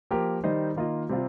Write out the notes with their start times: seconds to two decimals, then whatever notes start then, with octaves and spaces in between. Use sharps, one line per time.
0.11 F3 A#3 G4 A#4
0.44 D#3 G3 D#4 C5 D#5
0.76 D#3 A#3 F4 D#5
1.09 C3 G3 C4 F4